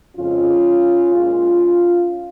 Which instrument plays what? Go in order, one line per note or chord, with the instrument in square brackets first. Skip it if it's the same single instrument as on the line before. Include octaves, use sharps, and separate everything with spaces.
[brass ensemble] F2 C#3 F3 G#3 C#4 F4
A#2 G#3 C#4 F4